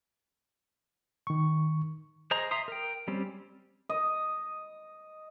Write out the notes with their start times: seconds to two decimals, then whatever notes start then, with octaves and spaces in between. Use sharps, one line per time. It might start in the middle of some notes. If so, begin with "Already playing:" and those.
1.27 D#3 C#6
2.31 G#4 C5 D#5 A#5
2.51 E5 A#5 C6 D#6
2.68 A#4 G5
3.08 G3 C4 C#4
3.89 D#5